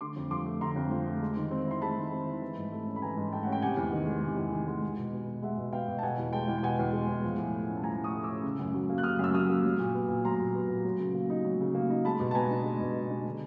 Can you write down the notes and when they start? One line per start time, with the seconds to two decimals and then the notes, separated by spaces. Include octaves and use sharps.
0.01 D3 C6 D6
0.16 F2
0.31 F3 C6 D6
0.46 A3
0.61 D3 A#5 C6
0.76 F2
0.91 F3
1.07 A3
1.21 G#3
1.37 D#3
1.51 C4
1.67 E4 C6
1.82 G#3 A5 B5
1.97 D#3
2.12 C4
2.27 E4
2.42 E3
2.57 G#2
2.72 A3
2.87 C#4
2.96 B5
3.02 E3 G#5 A#5
3.17 G#2
3.32 A3 G5 A5
3.43 C#4 F#5
3.52 G5
3.62 C3 F#5 G#5
3.77 E2
3.93 D#3
4.07 G#3
4.23 C3
4.37 E2
4.52 D#3
4.68 G#3
4.82 G#3
4.98 B2
5.13 B3
5.28 B2
5.42 G#3 E5 F#5
5.58 B2
5.73 B3 F5 G5
5.88 B2
5.99 A5
6.03 B2 F#5 G#5
6.18 E2
6.33 G#3 G5 A5
6.48 E2
6.58 G5
6.63 B2 F#5 G#5
6.79 E2
6.93 G#3
7.09 E2
7.24 F3
7.38 A2
7.53 A3
7.69 C#4
7.77 A5
7.83 F3 G#5 A#5
7.98 A2
8.04 C#6 D#6
8.14 A3
8.23 D6 E6
8.29 C#4
8.44 C#3
8.59 F#2
8.74 F#3
8.89 A#3
8.98 F#6
9.04 C#3 D#6 F6
9.19 F#2 E6
9.34 F#3 D#6 F6
9.50 A#3
9.64 F#3
9.79 A#2
9.94 B3
10.09 A#2
10.25 F#3 A#5 C6
10.40 A#2
10.55 B3
10.69 A#2
10.84 F#3
11.00 C#3
11.15 A#3
11.30 D#4
11.45 F#3
11.61 C#3
11.75 A#3
11.90 D#4
12.05 G#3 A5 B5
12.20 B2
12.31 A5
12.35 B3 G#5 A#5
12.50 D4
12.65 G#3
12.80 B2
12.96 B3
13.10 D4
13.26 D3